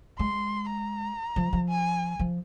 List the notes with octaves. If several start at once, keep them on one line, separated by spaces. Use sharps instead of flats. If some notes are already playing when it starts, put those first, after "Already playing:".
G#3 C6
A#5
F3
F3
G#5
F3